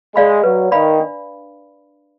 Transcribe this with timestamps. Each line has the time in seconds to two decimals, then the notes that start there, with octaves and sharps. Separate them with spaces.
0.16 G#3 D5 F5 B5
0.43 F#3 B4
0.71 D#3 D5 F5 B5
1.00 D4